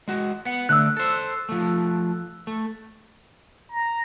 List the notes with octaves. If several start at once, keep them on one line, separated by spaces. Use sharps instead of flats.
G#3 F#4
B3 F#5
D3 A3 D4 E6 F#6
A4 C5
F3 A3
A3
A#5